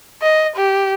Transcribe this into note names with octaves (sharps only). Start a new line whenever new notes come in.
D#5
G4